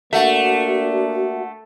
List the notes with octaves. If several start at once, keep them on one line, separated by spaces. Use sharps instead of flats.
A3 A#3 D4 F#4 E5 F#5